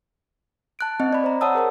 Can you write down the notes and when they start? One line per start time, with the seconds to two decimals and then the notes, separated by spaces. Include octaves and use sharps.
0.79 A5 F#6 D7
1.00 C4 D#5
1.13 D5 B5
1.24 C5 A#5
1.41 C#5 D5 F#5 A5 D#6 E6
1.55 G#4 A#4 C5 C#5